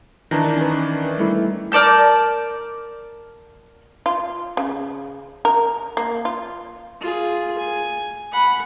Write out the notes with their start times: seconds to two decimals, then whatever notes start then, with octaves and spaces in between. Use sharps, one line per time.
0.31 D#3 E3 D4 A5 A#5 A#6
0.57 C#4 B4
1.18 G3 A3 E4
1.72 A#4 D5 A5 G6
4.06 F4
4.57 C#3
5.45 A#4
5.97 A#3
6.25 F4
7.00 F4 G#4
7.58 G#5
8.32 F#5 B5